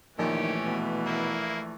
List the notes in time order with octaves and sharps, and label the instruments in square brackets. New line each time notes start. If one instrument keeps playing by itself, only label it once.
[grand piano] A#1 [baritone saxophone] D#3 [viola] E3 A3 [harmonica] C#4 G4
[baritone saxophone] B2
[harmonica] A#3 E4